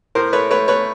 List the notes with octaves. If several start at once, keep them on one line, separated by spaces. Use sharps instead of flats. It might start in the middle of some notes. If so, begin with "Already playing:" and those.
A2 A#4 C5
A3 B4 C#5
A3 B4 C#5
A3 B4 C#5